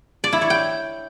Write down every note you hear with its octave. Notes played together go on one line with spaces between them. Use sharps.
D5
E4
C#5
G5